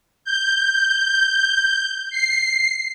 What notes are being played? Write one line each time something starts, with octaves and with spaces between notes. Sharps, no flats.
G6
C7